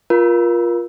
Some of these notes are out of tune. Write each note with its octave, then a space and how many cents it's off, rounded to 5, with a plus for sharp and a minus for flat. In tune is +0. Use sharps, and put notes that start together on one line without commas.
F4 +0 A#4 +30